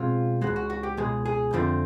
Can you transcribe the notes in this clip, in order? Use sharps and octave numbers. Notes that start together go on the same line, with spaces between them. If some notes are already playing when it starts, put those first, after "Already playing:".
Already playing: B2 G#3 C4 F4
B2 G#3 F#4
C#2
F#4
F#4
G4
C#2 B2 G#3 G#4
G#4
F2 D3 F3 A3 C4